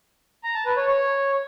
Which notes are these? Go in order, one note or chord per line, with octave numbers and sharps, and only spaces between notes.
A#5
A5
B4
C#5
C#5